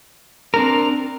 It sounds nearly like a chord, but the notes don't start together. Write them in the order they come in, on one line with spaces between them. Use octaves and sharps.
A#4 D4 C4